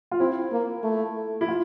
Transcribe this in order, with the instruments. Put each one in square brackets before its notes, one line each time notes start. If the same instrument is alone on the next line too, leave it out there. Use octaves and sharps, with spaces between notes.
[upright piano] F4
[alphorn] C4 [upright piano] E4
[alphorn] A#3
A3
[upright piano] E4
F4